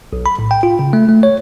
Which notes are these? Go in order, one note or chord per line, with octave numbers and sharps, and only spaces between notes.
B1
B5
A2
G5
F4
C#3
A3
A3
C#5